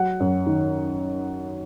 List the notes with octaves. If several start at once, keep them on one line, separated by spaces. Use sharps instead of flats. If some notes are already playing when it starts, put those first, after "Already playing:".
Already playing: F#3 F#5
F#2
D#3